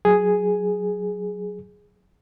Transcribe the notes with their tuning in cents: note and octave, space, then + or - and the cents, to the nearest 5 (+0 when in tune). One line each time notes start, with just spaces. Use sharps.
F#3 +0 G#4 +0